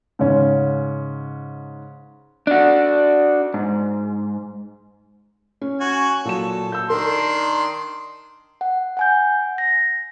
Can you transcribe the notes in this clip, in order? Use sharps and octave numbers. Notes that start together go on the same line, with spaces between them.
G#2 C#3 C#4
D4 F#4
G#2
C#4
F#4 G#5
A#2 F#3 A4 E7
A5 E6 G6
D#3 D4 A#4 C6
F#5
F#5 G#5 G6
A#6